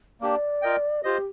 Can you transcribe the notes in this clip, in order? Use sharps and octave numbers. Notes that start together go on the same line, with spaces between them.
A#3 D4 G4 D5
F4 A#4 D#5 G5
F4 G4 C5 D#5